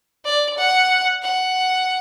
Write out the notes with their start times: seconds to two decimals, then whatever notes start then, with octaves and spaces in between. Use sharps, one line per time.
0.25 D5
0.58 F#5
1.22 F#5